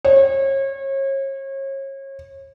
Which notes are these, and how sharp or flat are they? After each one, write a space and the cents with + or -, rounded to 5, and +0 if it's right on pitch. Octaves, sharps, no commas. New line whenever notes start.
C#5 -35